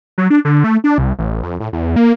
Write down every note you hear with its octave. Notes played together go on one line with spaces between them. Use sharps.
F#3
D4
D3
A3
D4
C2
A1
F2
A2
E2
A#3